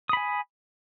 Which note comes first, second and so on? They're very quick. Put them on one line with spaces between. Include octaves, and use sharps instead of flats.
D#6 B5 G#5